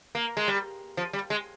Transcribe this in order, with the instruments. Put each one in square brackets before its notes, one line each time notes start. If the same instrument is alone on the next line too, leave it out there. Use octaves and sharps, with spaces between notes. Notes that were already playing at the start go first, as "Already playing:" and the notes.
[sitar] A#3
G#3
G3
F3
G3
G#3